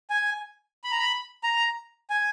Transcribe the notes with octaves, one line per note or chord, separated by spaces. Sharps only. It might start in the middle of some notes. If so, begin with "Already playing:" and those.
G#5
B5
A#5
B5
A#5
G#5